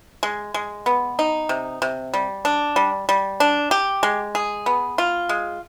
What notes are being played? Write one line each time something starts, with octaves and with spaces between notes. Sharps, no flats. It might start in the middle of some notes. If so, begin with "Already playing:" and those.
G#3
G#3
B3
D#4
C3
C3
G3
D4
G3
G3
D4
G4
G#3
G#4
B3
F4
G#3